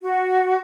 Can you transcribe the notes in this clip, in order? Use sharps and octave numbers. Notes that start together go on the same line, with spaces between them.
F#4